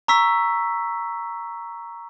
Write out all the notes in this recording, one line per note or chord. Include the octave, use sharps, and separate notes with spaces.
A#5 C#6 E6 B6